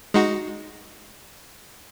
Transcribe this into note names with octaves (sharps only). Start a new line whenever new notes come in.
G#3 D#4 F#4